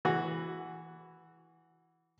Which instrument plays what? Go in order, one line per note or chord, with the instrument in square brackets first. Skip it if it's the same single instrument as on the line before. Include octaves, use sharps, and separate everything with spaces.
[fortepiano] E3 F#4